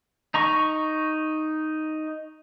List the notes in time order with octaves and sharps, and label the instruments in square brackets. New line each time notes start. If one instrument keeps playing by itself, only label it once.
[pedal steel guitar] D#4 A#5 C#6